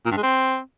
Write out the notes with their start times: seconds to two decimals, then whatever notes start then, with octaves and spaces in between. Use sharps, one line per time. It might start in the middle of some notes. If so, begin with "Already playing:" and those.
0.06 A#2
0.12 G2
0.17 G#3
0.23 C4